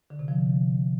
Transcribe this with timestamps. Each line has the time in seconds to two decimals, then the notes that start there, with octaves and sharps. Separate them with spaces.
0.10 D3
0.19 C3
0.28 F3